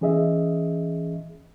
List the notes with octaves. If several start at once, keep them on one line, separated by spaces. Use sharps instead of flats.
E3 C#4 G#4 D#5 E5